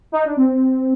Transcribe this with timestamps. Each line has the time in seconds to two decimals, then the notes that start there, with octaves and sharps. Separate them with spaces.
0.12 D#4
0.25 D4
0.36 C4